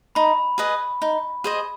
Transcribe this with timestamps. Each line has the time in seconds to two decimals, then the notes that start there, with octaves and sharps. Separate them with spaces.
0.15 D#4 B5
0.58 G#4 B4 D#5
1.02 D#4
1.44 G#4 C5 D#5